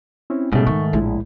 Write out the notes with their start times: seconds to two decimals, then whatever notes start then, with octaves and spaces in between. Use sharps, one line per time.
0.30 C4 C#4 E4
0.53 G#2 B2 G3 A3 C#4 G#4
0.66 D#3 C#6
0.93 A#1 A2 G#3 E4